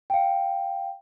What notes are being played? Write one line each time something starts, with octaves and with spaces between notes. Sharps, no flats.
F5 G5